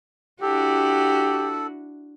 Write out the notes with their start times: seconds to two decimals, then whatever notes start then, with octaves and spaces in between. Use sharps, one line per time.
0.42 D4 E4 F#4 G4 A4